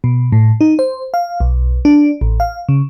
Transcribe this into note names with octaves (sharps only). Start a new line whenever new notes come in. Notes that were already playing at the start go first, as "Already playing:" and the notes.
B2
A2
D#4
C5
F5
B1
D4
A1
F5
C#3